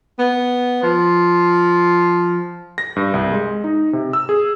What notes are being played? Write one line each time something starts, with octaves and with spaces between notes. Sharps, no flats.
B3
F3
A#6
G2
C2
G#3
D#4
C3
E6
G#4